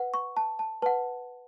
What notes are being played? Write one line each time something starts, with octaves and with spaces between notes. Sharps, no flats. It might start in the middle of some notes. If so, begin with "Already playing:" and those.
Already playing: B4 F#5
C#6
A5
A5
B4 F#5 A5